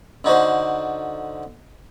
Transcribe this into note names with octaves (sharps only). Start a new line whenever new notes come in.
D3 D#4 F#4 C5